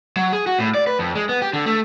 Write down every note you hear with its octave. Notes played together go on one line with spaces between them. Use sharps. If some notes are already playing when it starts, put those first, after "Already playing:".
F#3
G#4
F#4
A2
D5
B4
F2
G#3
B3
G4
D3
A3